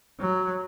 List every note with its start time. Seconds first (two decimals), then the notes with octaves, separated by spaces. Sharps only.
0.20 F#3